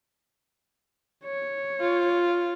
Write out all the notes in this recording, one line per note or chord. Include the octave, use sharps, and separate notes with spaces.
C#5
F4